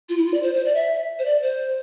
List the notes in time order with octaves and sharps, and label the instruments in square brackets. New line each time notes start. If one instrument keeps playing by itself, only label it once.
[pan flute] F4
E4
F4
D5
C5
C5
D5
E5
C5
D5
C5